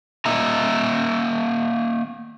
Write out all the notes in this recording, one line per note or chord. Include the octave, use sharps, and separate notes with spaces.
A#3 D#5 E5 A#5